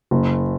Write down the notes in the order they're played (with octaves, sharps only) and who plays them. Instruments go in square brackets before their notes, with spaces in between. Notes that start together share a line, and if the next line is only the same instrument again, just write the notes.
[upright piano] F#1